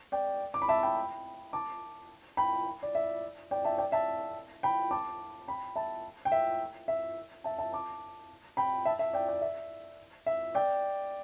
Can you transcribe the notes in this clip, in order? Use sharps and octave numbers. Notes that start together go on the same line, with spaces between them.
D5 G5
D6
B5
E5 A5
G5 B5
A5 D6
G5 B5
D5
E5
D5 G5
E5 A5
D5 G5
E5 A5
G5 B5
A5 D6
G5 B5
E5 A5
G5
E5
E5
E5 A5
E5 A5
A5 D6
G5 B5
E5 A5
E5
D5 G5
D5 G5
E5
E5
D5 G5